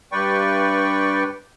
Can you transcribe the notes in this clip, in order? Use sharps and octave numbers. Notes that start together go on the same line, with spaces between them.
G2 B4 D5 G5 C#6